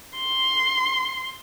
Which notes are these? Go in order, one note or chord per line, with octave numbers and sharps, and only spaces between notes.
C6